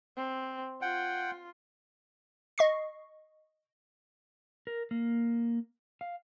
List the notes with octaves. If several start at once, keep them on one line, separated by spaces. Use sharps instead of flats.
C4
F4 F#5 G5
D#5 C#6 C7
A#4
A#3
F5